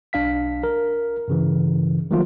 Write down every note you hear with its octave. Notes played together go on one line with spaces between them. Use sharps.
B1 D4 F5 B6
A#4
G2 C#3 E3
D#3 F3 F#3 A3 A#3 F4